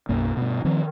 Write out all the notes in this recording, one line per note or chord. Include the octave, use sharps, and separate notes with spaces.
B1 F#2 A#3
G2 B2
D#3 F3 C4